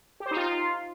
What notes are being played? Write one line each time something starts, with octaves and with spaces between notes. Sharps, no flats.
G4
C5
D#4
F4